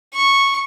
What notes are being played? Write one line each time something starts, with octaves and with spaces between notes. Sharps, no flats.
C#6